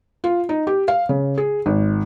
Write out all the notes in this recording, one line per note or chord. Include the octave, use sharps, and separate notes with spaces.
F4
D#4
G4
F5
C#3
G#4
G#1